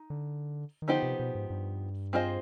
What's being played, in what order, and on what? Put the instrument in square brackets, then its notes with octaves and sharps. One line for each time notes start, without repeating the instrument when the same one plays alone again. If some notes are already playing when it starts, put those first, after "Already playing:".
Already playing: [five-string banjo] D#4
[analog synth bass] D3
D#3
[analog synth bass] D3 [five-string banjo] F3 B3 D#4 G4 C5
[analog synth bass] C3
B2
G#2
G2
[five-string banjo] C4 F4 G#4 C5 D#5